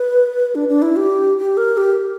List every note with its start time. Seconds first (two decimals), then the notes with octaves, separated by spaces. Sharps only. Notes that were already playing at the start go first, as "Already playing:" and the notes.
Already playing: B4
0.55 D4
0.68 D4
0.82 E4
0.96 G4
1.38 G4
1.57 A#4
1.77 G4